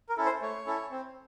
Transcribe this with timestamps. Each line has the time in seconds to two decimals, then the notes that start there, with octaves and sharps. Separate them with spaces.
0.09 A#4
0.17 C#4 E4 A4
0.25 C5
0.42 A3 C#5
0.67 C#4 E4 A4
0.91 C4